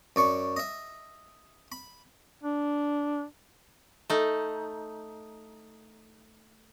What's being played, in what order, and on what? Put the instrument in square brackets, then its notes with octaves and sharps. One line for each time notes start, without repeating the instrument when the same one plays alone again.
[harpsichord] F#2 D5 C#6
D#5 E5
B5
[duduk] D4
[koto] A3 D#4